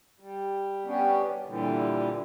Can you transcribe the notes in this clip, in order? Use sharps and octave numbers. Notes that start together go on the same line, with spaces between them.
G3
G3 B3 C#4 D4 G4
A#2 D3 E3 G3